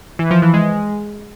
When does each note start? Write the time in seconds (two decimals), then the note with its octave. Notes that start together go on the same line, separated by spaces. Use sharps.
0.19 E3
0.31 F3
0.42 E3
0.54 G#3